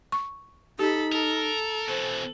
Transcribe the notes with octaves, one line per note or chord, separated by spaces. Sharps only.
C#6
D#4 G4 A4 B5
A4 A#4
B2 E3 C5